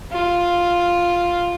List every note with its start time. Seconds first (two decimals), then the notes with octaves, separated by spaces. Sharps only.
0.12 F4